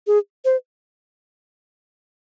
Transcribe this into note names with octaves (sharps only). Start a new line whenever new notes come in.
G#4
C5